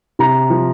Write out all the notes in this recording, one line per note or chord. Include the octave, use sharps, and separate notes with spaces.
C3 A#5
F3